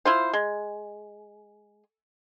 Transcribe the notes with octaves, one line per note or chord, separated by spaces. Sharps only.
E4 F4 C5
G#3